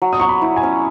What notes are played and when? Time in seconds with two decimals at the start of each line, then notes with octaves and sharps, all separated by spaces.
0.02 F#3
0.13 D#6
0.20 F#3 C#6
0.29 B5
0.42 E4
0.56 G#5
0.63 C#4